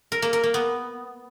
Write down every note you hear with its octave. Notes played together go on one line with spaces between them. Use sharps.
A#4
A#3
A#4
A#3
B3